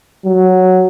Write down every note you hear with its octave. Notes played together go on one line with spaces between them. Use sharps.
F#3